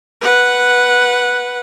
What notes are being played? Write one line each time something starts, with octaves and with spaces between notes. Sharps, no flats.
B4 F#5